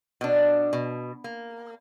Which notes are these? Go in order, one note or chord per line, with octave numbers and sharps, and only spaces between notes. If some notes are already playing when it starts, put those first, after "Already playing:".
B2 D4
B2
A#3